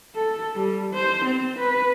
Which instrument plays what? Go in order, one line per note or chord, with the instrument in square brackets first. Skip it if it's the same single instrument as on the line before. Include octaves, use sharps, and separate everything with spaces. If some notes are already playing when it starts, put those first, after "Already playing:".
[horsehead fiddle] A4
G3
C5
C4
B4